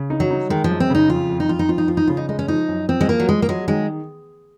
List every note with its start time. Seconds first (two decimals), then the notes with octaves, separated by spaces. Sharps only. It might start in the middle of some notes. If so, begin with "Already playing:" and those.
Already playing: C#3
0.10 D#4
0.20 F#3
0.30 D#4
0.50 D#3 G#3
0.64 F3
0.70 F#2
0.80 C4
0.90 C#3 D#4
1.10 F2 F4
1.30 F2
1.40 D#4
1.49 F2 F4
1.59 D#4
1.69 F3 F4
1.78 D#4
1.88 F3 F4
1.97 D#4
2.08 C#3 F4
2.17 D#4
2.29 G#3 D#4
2.39 C#4
2.48 F3 D#4
2.69 F#2
2.89 F3 C4
3.01 G#3
3.08 F3 A#3
3.20 F#3
3.29 F3 G#3
3.42 A#3
3.49 F#3 G#3
3.68 D#3 G#3